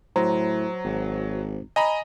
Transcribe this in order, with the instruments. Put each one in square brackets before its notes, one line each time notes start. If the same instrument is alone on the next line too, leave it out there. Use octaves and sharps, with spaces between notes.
[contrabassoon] A2 [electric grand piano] F#3 [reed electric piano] C5 A#5
[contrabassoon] G#1
[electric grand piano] D#5 A#5 B5 [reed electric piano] G#5